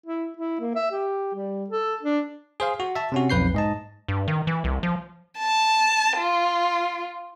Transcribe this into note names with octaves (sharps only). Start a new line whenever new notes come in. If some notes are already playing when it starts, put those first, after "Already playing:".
E4
E4
A#3
E5
G4
G3
A4
D4
G#4 C5 F5
F#4
E5 A5
C3 C#4 F#4
B1 F2 B4 G6 C7
G#2 D#5 A5
G2
D#3
E3
C2
F3
A5
F4